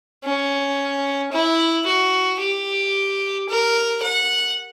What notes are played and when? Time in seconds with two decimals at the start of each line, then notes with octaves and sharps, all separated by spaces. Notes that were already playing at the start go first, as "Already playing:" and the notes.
0.24 C#4
1.32 E4
1.86 F#4
2.40 G4
3.49 A#4
4.03 F#5